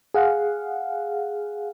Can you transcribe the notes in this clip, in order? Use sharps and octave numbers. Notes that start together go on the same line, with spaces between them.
G#4 F5 F#5